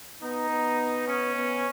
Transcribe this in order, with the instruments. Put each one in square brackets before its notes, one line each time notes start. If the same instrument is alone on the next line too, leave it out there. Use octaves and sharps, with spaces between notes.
[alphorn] B3 [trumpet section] D#4
[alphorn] B3
[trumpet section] C#4
[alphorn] B3